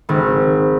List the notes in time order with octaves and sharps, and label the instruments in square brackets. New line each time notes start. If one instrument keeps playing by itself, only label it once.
[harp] G#1